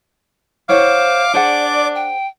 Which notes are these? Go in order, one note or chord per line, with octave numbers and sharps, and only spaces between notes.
E4 C5 C#5 F5 F#5 D6
D4 G#4 C5 D5 F#5
G5